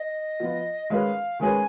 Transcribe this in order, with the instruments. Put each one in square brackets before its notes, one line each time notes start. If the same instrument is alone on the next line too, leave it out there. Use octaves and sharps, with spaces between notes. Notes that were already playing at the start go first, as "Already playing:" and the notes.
Already playing: [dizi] D#5
[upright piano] F3 B3 F4
[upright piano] D#3 G#3 C#4 G#4 B4 [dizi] F5
[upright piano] D#3 G#3 C#4 G#4 B4 [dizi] G#5